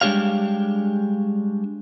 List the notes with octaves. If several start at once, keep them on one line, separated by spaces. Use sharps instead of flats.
G3 G#3 D4 G4 C#5 F5